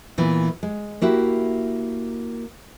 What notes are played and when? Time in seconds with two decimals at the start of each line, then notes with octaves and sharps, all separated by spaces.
0.18 A#2 E3 B3
0.63 G#3
1.02 A#3 E4 F#4 G4